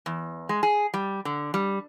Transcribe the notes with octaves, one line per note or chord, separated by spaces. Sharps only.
E2
G#3
G#4
G3
D3
G3